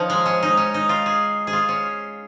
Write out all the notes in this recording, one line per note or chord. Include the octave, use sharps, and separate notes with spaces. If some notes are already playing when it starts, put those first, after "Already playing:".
Already playing: F3 C#4 D#4
G#3
C#4
D#4
C#4
D#4
F4
G#4
G#4
F4
C#4